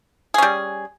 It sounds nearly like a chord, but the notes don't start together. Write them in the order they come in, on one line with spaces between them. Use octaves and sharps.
G#4 C#4 G3